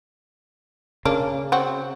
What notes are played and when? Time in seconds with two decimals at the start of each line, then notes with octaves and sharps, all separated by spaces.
1.05 C#3 A#3 D4
1.52 C4 F#4